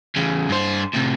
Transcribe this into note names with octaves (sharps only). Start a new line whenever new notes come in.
E2 C#3
G2 C5
A2 C3